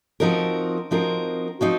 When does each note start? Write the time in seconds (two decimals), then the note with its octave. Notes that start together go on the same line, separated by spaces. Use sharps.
0.20 F3 C4 D#4 F#4 A#4
0.91 F3 C4 D#4 F#4 A#4
1.60 F3 C4 D#4 F#4